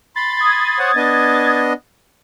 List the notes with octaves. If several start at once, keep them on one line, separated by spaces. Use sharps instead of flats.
B5 C6 A6
D#6 G#6 A6
C5 C#5 F#5
B3 D4 D#5